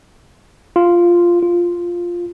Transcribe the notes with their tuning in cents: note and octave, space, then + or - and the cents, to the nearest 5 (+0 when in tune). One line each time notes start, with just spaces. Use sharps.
F4 -5
F4 +0